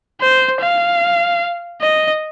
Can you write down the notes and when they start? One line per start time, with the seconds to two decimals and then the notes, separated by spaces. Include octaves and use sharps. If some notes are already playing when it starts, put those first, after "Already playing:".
0.21 C5
0.61 F5
1.81 D#5